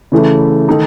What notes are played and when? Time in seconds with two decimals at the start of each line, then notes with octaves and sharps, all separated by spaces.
0.12 C#3 E3 A3
0.68 D#3 A3 D#4 A4